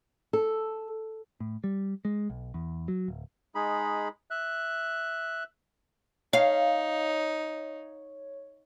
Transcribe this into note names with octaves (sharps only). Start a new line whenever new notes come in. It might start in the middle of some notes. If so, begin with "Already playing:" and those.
A4
A2
G3
G#3
B1
E2
F#3
D1
G#3 D#4 G#4 B5
E5 F#6
D#4 C#5 F5